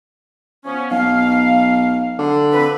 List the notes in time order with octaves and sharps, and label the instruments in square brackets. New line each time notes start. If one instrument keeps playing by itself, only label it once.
[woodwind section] F3 B3 C#4
[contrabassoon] B1 [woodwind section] F5
[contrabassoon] D3
[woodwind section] F3 C4 B4